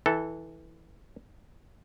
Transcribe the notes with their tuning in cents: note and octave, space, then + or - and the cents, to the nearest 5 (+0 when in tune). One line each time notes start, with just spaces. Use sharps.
E3 -15 A4 +0